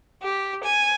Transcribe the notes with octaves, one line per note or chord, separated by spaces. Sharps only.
G4
G#5